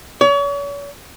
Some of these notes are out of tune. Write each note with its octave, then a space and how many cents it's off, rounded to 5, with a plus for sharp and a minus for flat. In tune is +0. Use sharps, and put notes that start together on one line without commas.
C#5 +40